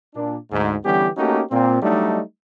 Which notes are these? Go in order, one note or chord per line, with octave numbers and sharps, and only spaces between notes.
A#2 D4
D2 G#2
D3 E3 G3 B3 C#4 G4
A3 A#3 C#4 D#4 F#4 G4
A#2 C4
F#3 G3 A3 D4 D#4